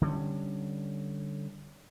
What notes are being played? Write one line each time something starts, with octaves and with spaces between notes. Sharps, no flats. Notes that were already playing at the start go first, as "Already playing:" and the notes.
D3 G3 C#4